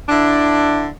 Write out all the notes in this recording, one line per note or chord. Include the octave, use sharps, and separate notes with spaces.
D3 D4 E4